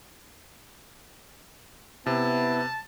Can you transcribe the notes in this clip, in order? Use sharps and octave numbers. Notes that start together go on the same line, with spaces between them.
C3 B3 E4 A5